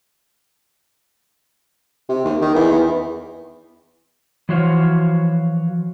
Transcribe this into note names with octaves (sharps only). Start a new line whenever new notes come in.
C3
D#2
D#3
E2
E2
E3 F3 F#4 C5 C#5 F5